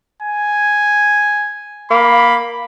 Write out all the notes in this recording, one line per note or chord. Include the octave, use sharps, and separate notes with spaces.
G#5
A#3 B5